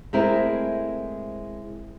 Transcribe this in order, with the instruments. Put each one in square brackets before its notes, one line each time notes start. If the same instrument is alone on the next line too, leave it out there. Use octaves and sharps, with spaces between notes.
[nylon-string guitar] G#3 A3 C4 E4 A#4